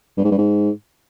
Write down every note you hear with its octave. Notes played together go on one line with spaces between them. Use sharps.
G2
G#2
G2
G#2